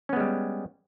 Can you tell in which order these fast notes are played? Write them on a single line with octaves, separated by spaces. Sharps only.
C#4 B3 G#3 G3